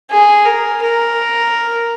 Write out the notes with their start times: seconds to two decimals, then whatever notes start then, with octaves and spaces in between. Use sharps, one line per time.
0.11 G#4
0.46 A#4
0.82 A#4